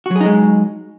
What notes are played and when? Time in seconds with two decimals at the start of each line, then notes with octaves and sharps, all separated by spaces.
0.06 F#4
0.11 F#3
0.16 G#4
0.21 D#4
0.26 G#3